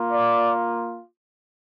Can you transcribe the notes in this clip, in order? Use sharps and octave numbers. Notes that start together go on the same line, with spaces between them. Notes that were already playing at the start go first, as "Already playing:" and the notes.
Already playing: A#3 F4
D5